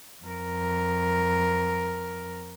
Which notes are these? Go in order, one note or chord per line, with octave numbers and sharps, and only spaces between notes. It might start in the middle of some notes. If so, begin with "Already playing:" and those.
F2 A#4